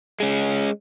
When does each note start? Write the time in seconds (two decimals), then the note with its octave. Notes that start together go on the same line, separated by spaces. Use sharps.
0.20 G#3 C#4